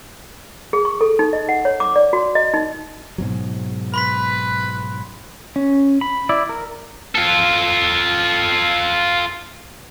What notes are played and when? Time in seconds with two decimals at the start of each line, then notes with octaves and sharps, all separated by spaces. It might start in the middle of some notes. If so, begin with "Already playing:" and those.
0.73 G#4
0.85 C#6
1.01 A4
1.19 D#4
1.33 D#5
1.49 F#5
1.65 C#5
1.80 D6
1.96 D5
2.13 F#4
2.35 D#5
2.54 D#4
3.18 G#2 B2 F#3
3.94 B4 B5 C6 B6
5.56 C#4
6.01 B5
6.29 E4 D5
6.49 A#4
7.15 F4 A4